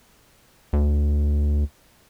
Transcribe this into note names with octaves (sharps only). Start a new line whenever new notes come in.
D2